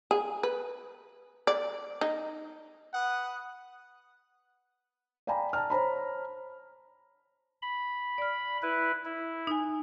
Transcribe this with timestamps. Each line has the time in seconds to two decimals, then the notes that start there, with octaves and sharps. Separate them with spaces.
0.11 G#4
0.43 B4
1.47 D5
2.01 D#4
2.94 B4 F#5 D#6
5.27 D5 F5 G5 G#5 A#5 B5
5.53 A5 A#5 F6
5.70 C5 C#5 A#5 B5
7.62 B5
8.18 D5 F6
8.62 E4 B4
9.05 E4
9.47 D#4 G#5